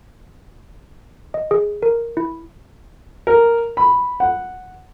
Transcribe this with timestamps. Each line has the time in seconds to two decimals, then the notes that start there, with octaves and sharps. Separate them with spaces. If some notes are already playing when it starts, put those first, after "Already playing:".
1.34 D#5
1.51 G#4
1.82 A#4
2.17 E4
3.27 A#4
3.77 B5
4.20 F#5